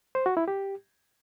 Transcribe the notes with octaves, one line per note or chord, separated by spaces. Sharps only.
C5
F#4
E4
G4